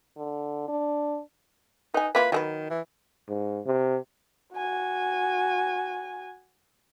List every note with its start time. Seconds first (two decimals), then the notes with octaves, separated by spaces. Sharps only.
0.17 D3
0.68 D4
1.94 D#4 B4 G#5
2.15 A#3 E4 F4 B4
2.32 D#3 F#3 G#4 B4
2.70 E3
3.28 G#2
3.66 C3
4.54 F#4 G#5